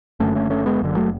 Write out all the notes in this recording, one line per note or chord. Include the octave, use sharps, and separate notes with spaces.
F#1 F#2 D3 A3 C#4
A3 C#4
A3 C#4
G#3 B3
F#1 F#2 D3
F#3 A3